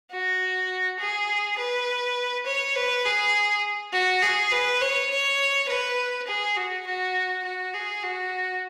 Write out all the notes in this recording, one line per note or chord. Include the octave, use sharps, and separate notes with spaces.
F#4
G#4
B4
C#5
B4
G#4
F#4
G#4
B4
C#5
C#5
B4
G#4
F#4
F#4
F#4
G#4
F#4